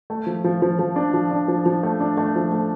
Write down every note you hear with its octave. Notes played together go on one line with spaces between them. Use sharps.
A3
F3
F3
F3
F3
D4
F3
D4
F3
F3
A3
D4
A3
F3
A3